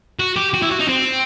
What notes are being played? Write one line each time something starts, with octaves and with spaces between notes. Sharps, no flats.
F#4
G4
F#4
E4
F#4
D#4
C4